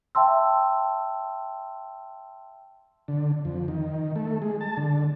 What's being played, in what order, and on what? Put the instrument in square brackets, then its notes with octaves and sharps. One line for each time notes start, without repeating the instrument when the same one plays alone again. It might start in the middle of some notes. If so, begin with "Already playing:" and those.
[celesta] E5 G5 A5 C6 E6
[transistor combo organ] D3
F2
D#3
A3
G#3
A5
D3